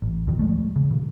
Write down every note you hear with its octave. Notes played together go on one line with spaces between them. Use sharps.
A1
D#2 B2 D#3
F3 G#3 A3
C#3
B2 D#3